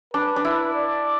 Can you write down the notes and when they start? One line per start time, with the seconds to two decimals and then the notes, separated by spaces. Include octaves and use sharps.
0.14 D4 B4
0.36 D4
0.45 E4
0.74 D5